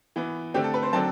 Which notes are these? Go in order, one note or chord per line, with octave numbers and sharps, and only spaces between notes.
E3 B3
D3 A3 C4 G4
A4
B4
C5
D3 F#3 C4 A5